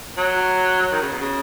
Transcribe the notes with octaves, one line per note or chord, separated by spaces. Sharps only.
F#3
D#3
C#3
B2
C#3